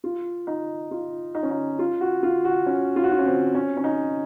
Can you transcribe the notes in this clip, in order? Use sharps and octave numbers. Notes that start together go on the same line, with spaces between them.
F4
D#4
F4
D#4
C#4
D#4
F4
F#4
F4
F#4
C#4
F4
F#4
F4
C#4
C4
C#4
C#4
D#4